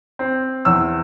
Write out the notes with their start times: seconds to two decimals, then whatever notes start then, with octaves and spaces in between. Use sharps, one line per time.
0.19 C4
0.65 E2 E6